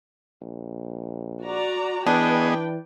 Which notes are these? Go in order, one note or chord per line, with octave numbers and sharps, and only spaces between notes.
A#1
F#4 D5 A#5
E3 B3 D4 G#4 B4 D5 D#5 G5